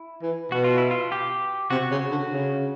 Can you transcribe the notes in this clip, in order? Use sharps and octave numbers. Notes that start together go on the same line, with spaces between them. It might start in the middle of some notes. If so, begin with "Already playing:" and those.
Already playing: E4
E3
B2 F#4
F4
E4
F4
G4
C3 F#4
C#3
D3
C#3